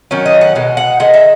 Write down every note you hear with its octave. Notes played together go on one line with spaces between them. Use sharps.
D#3 F#3 C#4
D#5
F#5
B2 G#3 D#4
F#5
D#3 G#3 D#4 F#5
E5